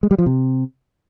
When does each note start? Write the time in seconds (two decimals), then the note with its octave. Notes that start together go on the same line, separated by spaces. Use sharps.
0.03 G#3
0.11 G3
0.18 F3
0.26 C3